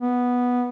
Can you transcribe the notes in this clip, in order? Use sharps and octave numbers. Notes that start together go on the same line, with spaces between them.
B3